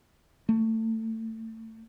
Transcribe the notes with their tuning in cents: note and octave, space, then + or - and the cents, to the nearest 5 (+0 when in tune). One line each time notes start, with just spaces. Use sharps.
A3 +25